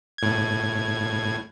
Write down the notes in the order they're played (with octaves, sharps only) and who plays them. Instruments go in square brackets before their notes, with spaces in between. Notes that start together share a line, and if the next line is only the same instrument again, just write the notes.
[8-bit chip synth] A2 G#6